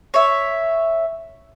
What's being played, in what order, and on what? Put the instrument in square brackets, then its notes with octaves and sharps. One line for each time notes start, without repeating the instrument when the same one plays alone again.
[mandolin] C#5 E5